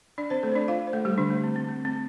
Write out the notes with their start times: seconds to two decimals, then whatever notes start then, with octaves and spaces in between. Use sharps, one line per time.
0.18 D4 D5
0.30 C4 C5
0.43 A3 A4
0.52 C5
0.55 D4 D5
0.68 F4 F5
0.87 C5
0.93 A3 A4
1.05 G3 G4
1.18 D3 D4
1.30 A3
1.44 C4
1.56 C4
1.68 A3
1.85 C4